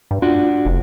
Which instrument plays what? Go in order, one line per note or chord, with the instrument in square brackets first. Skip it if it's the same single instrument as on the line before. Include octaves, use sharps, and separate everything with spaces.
[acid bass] G2
[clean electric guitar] D4 F#4 [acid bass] F4
[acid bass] F1